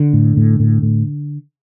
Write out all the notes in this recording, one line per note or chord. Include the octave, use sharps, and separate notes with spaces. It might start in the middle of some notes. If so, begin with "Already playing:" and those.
Already playing: D3
A2
A2
A2
A2